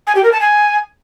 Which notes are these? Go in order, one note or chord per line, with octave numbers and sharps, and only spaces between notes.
G#5
G4
A#4
A5
G#5